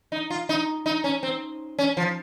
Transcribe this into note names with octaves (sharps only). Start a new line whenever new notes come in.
D#4
F4
D#4
D#4
C#4
C4
C#4
F3